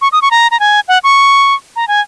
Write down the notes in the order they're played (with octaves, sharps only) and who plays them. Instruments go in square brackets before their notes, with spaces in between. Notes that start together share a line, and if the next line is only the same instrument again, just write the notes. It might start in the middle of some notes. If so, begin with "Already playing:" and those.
[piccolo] C#6
D#6
C#6
A#5
A#5
G#5
F#5
C#6
A#5
G#5